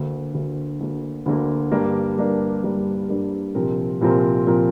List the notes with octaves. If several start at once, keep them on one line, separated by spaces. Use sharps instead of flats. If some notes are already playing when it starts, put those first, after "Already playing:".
Already playing: D2 D3 A#3
D2 D3 A#3
D2 D3 A#3
D2 D3 A#3
G2 G3 A#3 D4 A#4
G2 G3 A#3 D4 A#4
G2 G3 A#3 D4 A#4
G2 G3 A#3 D4 A#4
C2 A#2 F3 C4 A#4
C2 A#2 F3 C4 A#4
A#2 F3 C4 A#4